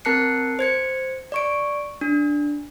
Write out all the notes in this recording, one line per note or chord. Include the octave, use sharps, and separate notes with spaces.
C4 A#4 A5 F#6 C7 C#7
C5 G#6 C#7
D5 C#6 D7
D4